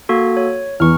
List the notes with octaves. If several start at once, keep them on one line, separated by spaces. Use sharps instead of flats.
A#3 F#4 A4
C#5
E2 C#6 F6